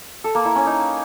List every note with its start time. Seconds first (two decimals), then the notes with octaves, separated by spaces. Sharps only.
0.24 A4
0.35 A#3
0.45 E4
0.56 C#4
0.66 D#4